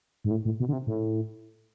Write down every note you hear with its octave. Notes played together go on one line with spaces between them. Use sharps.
G#2
A2
A2
B2
D3
C3
A2